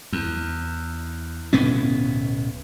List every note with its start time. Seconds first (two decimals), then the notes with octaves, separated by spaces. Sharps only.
0.12 E2
1.53 D1 B2 B3 C#4